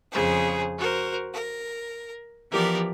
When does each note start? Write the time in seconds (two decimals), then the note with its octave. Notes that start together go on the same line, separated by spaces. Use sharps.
0.11 F2 C#3 G#4 C5
0.78 F#4 A#4 C5
1.33 A#4
2.51 E3 F3 B3 G4 A#4 D5